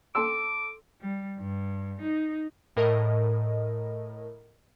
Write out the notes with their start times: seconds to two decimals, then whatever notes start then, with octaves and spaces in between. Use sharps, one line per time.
0.15 A4 C6 D6 E6
1.01 G3
1.38 G2
2.01 D#4
2.76 A2 A#4 D#5